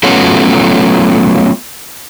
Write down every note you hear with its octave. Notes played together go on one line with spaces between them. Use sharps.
F#3 A3 B3 C#4 F4 F#4